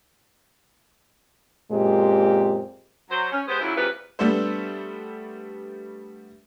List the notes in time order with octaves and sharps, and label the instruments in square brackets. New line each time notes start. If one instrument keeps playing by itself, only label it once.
[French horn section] F#2 A#2 G#3 C4 G4
[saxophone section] F#3 C5
C#4
G#3 B3 G4 G#4 C5
A#2 C#3 F#3 E4
A#2 C#3 E3 F3 G3 B4
[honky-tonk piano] G3 A3 B3 D4 A4 C5